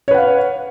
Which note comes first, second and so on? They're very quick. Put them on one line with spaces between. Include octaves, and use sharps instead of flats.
C#5 B4 F#5 F5